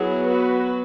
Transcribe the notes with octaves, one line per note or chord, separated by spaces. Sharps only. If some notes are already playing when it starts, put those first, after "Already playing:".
Already playing: F#3 B3 E4 G#4
F#4 B4